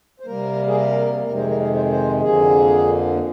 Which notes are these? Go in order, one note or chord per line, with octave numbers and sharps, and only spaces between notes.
C5
C3 G3 A#3 A#4
G#4
A#4
F2 C3 D#3 G#3 A#4
C5
A#4
G#4
C5
C5
F2 D3 F3 A#3 G#4